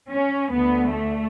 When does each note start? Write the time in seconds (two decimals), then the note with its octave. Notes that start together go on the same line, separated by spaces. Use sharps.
0.12 C#4
0.52 D2 D3 B3
0.93 A3